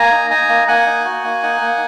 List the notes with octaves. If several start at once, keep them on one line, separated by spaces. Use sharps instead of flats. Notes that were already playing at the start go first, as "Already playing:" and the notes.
Already playing: A#3 G#5 A#5
D#4
D#4 G#5 A#5
A#3
A#3 F#5 G#5
D#4
F#4
A#3
D#4
A#3